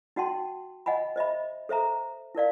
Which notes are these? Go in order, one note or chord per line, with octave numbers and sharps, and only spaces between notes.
D#4 F#4 F#5 G5 A5 C6
D#5 F#5 G#5 B5
C5 D#5 E5 B5
A4 C5 E5 A#5
E4 A#4 D5 F5